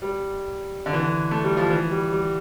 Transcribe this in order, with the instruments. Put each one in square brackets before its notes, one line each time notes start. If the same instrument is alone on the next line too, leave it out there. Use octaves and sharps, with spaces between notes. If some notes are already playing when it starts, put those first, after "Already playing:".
[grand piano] G3
D3
E3
D3
A3
G3
F3
E3
G3
G3